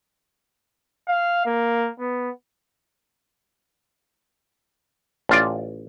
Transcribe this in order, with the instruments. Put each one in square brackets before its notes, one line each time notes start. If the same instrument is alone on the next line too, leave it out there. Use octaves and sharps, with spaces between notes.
[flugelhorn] F5
A#3
B3
[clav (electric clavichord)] A1 F4 D5